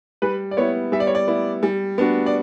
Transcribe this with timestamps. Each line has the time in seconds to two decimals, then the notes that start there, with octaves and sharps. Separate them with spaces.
0.22 G3 B4
0.51 D5
0.57 B3 E4 C#5
0.92 G3 E5
1.00 D5
1.07 C#5
1.15 D5
1.27 B3 E4
1.63 G3
1.98 B3 D4 F#4
2.26 D5